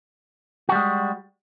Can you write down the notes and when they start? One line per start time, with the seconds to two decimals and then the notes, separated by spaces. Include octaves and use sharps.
0.69 F#4
0.72 G3
0.75 G#3